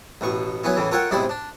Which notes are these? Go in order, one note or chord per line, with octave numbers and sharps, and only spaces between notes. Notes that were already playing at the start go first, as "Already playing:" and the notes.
A1 B2 C#6
F#3 B3 C#4 E4
A2 C#3 E3
F4 A4 A#4 C#5 F#5 G5
B1 G#2 C3 E4 D5 B5
D4